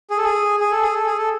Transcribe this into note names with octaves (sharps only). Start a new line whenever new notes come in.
G#4
A4
G#4
G#4
A4
G#4
A4
G#4
A4